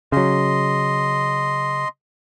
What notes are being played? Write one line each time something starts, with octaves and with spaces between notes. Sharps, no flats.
C#3 F#3 D#5 C6